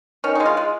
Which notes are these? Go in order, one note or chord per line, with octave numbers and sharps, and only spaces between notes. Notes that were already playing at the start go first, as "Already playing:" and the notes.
D#3 C#4
G#3 D#4
F4
G#3